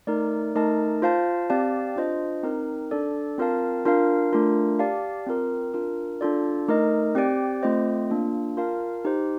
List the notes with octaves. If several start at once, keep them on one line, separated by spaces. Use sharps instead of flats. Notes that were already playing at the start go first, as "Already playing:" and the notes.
A3 D#4 A#4 D5
A3 D#4 A#4 D#5 A5
F4 C5 F5 A5
C4 G4 D5 F5 A5
D4 F4 C5 D#5
C4 D#4 A#4
D4 A4 D5
C4 F4 A#4 F5 A5
D4 F4 A#4 F5
A3 D4 F4 A#4
G4 D5 F5 A5
C4 F4 A#4
D4 F4 A#4
D4 F4 A4 D5
A3 D#4 A#4 D#5
C4 G4 D5 G5
A3 C4 F4 C5 D#5
A#3 D4 F4
F4 A#4 F5 A5
D#4 G4 C5